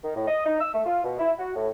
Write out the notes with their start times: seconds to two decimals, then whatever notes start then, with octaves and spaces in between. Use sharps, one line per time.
0.04 D#3
0.16 A2
0.28 D#5
0.46 D#4
0.61 E6
0.74 A3
0.86 F4
1.04 B2
1.19 E4
1.39 F#4
1.56 A2